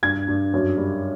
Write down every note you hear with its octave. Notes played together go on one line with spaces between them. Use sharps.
G2 G#6
G2
F#2
G3